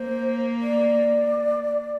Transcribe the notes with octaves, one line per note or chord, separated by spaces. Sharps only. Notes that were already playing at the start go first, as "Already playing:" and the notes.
Already playing: A#3 C5
D5